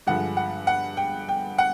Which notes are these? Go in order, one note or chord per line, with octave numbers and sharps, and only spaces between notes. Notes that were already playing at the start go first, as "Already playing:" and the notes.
G2 D3 F3 G#3 F#5
F#5
F#5
G5
G5
F#5